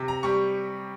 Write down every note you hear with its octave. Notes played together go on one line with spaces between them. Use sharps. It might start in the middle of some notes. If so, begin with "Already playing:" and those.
Already playing: C3
A#5
G3 C#6